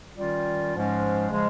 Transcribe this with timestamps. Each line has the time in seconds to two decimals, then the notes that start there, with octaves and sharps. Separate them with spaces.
0.17 D#3 G3 C#4 F4
0.74 G#2 F3 G#3 C#4
1.31 C#3 F3 G#3